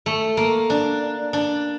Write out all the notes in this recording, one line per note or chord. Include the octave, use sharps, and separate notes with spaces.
A3
A#3
D4
D4